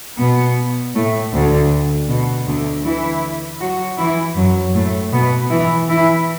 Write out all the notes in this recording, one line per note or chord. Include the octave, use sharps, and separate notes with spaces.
B2 B3
A2 A3
D2 D3
B2
D2 D3
E3 E4
F#3 F#4
E3 E4
F#2 F#3
A2 A3
B2 B3
E3 E4
E3 E4